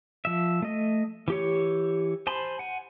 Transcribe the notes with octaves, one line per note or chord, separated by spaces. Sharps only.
F3 E5
A3 D#5
E3 G4 C#5
C5 G#5 A5 B5 C6
F#5 G#5